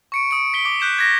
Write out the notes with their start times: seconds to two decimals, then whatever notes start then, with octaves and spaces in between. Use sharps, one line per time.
0.12 C#6 C#7 D7
0.31 D#6 D7
0.54 B6 D7 G7
0.65 D6
0.80 F#6 G6 B6 E7
0.98 G#6 A#6 B6